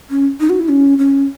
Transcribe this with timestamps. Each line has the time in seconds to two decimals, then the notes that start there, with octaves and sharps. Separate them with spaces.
0.10 C#4
0.40 D#4
0.50 F#4
0.59 E4
0.69 C#4
0.98 C#4